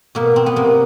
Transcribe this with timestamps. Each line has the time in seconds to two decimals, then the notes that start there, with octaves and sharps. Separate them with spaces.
0.15 B2 A#3
0.36 C4
0.46 B3
0.56 C3 A#3